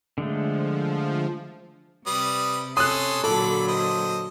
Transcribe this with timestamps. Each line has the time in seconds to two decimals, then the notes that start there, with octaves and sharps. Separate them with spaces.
0.18 D3 F3 G#3 A3
2.07 C3 G3 B4 D#6
2.77 C#4 A4 C6 D#6 F#6
3.24 A#2 D3 F#3 A4 B5 D6
3.68 C5 D#5